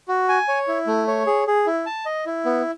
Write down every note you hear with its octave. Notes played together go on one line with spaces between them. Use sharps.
F#4
G#5
C#5
E4
A3
C#5
G#4
G#4
E4
A5
D#5
E4
B3